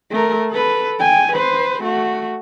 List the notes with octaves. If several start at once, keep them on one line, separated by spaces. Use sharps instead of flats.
A3 A#4
A4 B4
G5 G#5
B4 C5
A3 F#4